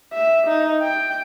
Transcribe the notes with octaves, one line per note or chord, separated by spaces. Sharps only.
E5
D#4
G5